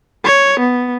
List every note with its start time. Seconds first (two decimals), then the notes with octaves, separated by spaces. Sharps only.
0.25 C#5
0.60 B3